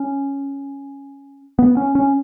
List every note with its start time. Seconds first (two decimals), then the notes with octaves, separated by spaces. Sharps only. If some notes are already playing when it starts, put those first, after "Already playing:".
Already playing: C#4
1.59 B3
1.77 C#4
1.95 C#4